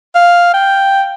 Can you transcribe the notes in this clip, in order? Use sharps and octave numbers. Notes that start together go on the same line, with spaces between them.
F5
G5